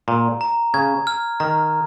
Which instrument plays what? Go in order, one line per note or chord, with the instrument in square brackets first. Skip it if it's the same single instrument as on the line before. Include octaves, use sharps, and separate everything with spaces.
[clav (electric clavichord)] A#2 [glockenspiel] A#5
[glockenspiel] A#5
[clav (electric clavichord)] C#3 [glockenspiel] G#6
[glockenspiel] F6
[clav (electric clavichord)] D#3 [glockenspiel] A#5